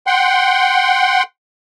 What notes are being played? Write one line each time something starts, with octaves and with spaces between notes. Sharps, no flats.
F#5 G5 C6